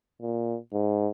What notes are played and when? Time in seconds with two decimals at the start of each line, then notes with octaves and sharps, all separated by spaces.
0.22 A#2
0.73 G#2